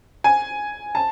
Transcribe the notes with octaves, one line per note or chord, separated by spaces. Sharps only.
G#5
A5